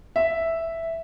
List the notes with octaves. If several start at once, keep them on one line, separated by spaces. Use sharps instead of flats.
E5